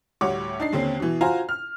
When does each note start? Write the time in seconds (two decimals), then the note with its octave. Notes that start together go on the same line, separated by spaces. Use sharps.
0.21 D2 A2 G3 C#5 F#5 D6
0.60 D4 D#4 C7
0.72 D#2 D3 C4 C#4
1.00 B2 E3
1.21 F4 F#4 C5 F5 G#5 A#5
1.49 F6